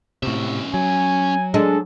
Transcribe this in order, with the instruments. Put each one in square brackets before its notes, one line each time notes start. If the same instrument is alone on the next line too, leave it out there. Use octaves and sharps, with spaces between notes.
[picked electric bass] A2 C3 [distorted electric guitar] C#4 E5
[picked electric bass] F#3 [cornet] G#5
[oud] G#3 D4 [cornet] A4